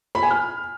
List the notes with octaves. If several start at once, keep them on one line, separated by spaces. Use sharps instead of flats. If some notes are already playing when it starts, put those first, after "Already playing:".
B5
G#5
F6